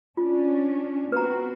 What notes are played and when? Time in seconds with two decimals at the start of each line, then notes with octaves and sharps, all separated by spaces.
0.17 C#4 D4 F4
1.12 B3 C4 F#4 B4 A#5